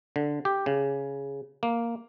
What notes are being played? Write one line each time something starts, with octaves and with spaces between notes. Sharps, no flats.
D3
G4
C#3
A#3